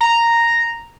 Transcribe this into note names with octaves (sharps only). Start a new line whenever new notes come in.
A#5